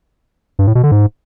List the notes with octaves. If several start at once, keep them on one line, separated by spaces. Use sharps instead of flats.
G2
A2
B2
D3
G#2